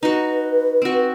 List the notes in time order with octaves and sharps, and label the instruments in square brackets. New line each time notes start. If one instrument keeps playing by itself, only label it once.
[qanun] D#4 F#4 [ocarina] B4
[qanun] C4 F#4